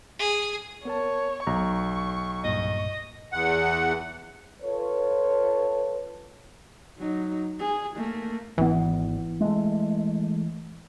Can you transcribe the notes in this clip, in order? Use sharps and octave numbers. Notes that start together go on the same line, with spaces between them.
G#4
B3 A#4 C#5 A5
B1 A#5 C#6
C2 G2 A#2 D#5
E2 F#5
F4 A4 B4 C#5
F#3 D#4
G#4
A3 A#3
G#1 E3 B3
G#3 A3